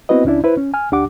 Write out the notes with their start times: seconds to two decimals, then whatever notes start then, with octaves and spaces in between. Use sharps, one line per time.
0.09 B3 C4 E4 F#4 B4 D#5
0.25 C#2 C#4 D4 E4 D5
0.44 E4 B4 C5
0.57 C#4
0.74 G#5 F6
0.92 D2 D4 G4 F#5 D6